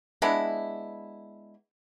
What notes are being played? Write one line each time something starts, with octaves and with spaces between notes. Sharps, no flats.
G#3 B3 D4 E4